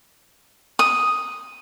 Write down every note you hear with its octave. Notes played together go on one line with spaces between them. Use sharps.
D#6